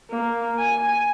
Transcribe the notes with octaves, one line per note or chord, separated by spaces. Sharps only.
A#3
G#5